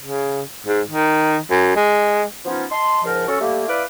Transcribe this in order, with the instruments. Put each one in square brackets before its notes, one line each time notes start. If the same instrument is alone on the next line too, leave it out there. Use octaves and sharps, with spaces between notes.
[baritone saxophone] C#3
G#2
D#3
F#2
G#3
[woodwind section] F3 B3 C#4 D#4 F4
D#5 A5 C6
C#2 G#2 F3 A#4
F#3 C#4 F#4 A4
G3 A3 A#3
E4 B4 D5 F5 D6